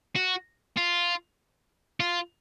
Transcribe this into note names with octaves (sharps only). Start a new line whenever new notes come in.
F#4
F4
F4